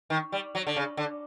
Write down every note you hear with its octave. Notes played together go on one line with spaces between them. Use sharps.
D#3
G3
F#3
D3
C#3
D3